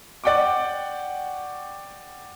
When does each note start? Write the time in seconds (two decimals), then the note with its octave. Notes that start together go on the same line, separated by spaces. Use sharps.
0.24 D5 F#5 G5 C#6 D6